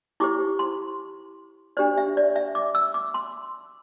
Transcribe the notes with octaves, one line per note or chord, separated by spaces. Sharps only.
E4 G4 C5 D6
C6
D4 G4 C5 D5
E5
D5
E5
D6
E6
D6
C6